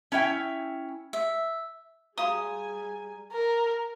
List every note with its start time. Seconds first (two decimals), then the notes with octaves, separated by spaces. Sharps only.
0.12 C#4 E4 E5 G5
1.13 E5
2.18 G3 F#4 G#4 F5 G#5 A#5 B5 D#6
3.32 A#4